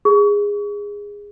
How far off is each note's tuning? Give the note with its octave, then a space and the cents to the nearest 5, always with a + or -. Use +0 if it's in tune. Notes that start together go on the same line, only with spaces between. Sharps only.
G#4 -20